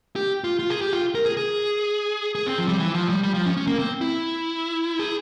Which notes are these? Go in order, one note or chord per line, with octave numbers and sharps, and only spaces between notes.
G4
F4
F4
G#4
G4
F4
A#4
G#4
G#4
G#4
C4
F3
G3
E3
F3
G3
G3
F3
C#4
C#4
A#3
C4
E4
G#4